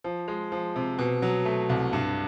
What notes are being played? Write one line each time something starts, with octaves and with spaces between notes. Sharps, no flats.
F3
G#3
F3
C3
B2
F#3
A3
C2
G2